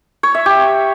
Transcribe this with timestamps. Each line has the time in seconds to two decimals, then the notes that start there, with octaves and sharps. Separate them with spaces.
0.23 C#5
0.35 E5
0.46 G4